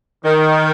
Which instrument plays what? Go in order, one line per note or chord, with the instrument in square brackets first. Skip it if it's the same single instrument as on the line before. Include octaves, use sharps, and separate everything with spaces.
[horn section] D#3